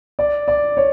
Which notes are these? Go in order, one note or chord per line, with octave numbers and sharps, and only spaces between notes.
D5
D5
C#5